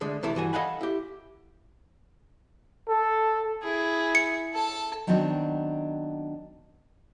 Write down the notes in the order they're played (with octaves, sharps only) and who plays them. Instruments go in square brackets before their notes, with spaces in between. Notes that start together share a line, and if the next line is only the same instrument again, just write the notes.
[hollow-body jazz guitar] D3 G#3 A3
C3 E3 A3 E4
G2 E3 F#4 G#5
A4 D#5 F5 F#5 G#5 B5
E4 G4
[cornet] A4
[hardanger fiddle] E4 G#4
[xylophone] C#7
[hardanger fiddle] A4 A5
[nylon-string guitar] D#3 F#3 B3 C4 D4 D#4